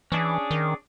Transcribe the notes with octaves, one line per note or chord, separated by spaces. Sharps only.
E3 C#4 D4 G#4
D#3